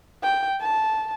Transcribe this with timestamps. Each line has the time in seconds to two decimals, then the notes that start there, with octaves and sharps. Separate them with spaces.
0.24 G5
0.61 A5